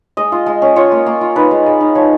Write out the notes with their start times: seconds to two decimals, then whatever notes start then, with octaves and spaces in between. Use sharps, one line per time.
0.17 G#3 D#5
0.32 F4
0.46 G#3
0.62 C#4
0.76 F4 C#5
0.92 A#3
1.06 A#3
1.21 F4
1.36 D#4 B4
1.51 G#3
1.66 G#3
1.81 D#4
1.95 F3 C#5